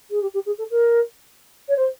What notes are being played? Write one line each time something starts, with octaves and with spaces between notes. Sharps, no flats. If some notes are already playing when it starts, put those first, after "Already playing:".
G#4
G4
G4
G#4
A4
A#4
C#5
C5